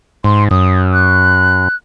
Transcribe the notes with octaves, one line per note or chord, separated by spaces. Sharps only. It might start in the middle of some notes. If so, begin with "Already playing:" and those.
G#2 C6
F#2 D#6
F#6